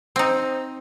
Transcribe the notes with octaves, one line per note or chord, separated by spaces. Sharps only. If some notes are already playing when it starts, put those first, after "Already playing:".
C4 D#4